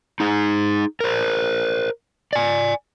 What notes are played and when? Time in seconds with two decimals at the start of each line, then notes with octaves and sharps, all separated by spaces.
0.20 D#4 G#4
1.00 A#4 C5
2.33 D5 G#5